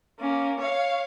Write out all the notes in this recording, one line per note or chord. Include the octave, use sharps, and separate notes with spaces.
A#3 C#4
C#5 F5